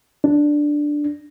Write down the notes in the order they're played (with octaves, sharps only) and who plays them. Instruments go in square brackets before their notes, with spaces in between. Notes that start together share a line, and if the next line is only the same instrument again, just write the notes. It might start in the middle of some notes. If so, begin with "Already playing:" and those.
[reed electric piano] D4